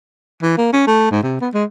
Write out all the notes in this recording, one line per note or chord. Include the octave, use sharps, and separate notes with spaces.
E3
A#3
C#4
A3
G#2
C3
B3
G#3